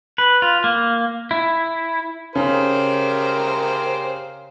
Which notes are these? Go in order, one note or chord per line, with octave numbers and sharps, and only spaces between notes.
B4
F4
A#3
E4
C#3 G4 A#4 C5